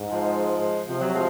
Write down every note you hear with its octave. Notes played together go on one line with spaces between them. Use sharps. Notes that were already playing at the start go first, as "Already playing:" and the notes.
Already playing: G#2
F3 G#3
C3 F3
F#3
F3 G#3